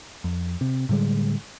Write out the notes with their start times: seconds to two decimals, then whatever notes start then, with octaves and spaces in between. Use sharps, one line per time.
0.24 F2
0.61 C3
0.89 A2 D3 G3 G#3